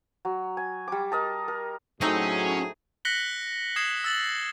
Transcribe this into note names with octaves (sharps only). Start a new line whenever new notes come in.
F#3
G#5
G3 D6
A#4 D#5 A5
A#4
A2 F#3 A3 C4 C#4 D#4 G#4
F#6 A#6 B6 C#7 F#7 G7
D#6 G#6 C7 E7
E6 A6 F#7